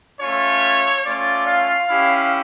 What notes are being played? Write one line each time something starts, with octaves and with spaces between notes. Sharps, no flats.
A3 C#4 F4 C#5
A3 C#4 F4 D5
F5
C#4 E4 G4